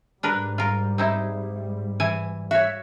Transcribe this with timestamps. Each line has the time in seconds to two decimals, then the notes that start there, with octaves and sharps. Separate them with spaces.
0.23 G#2 G3 D4 A#4 B4
0.58 F4 A#4
0.98 C4 D#4 E4
2.00 E3 E4 G#5
2.51 F#4 C#5 E5